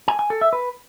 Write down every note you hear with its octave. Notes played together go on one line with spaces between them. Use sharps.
G#5
G#5
A4
E5
B4